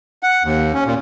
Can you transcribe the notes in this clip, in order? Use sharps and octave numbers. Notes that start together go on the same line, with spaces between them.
F#5
D#2
C#4
A#2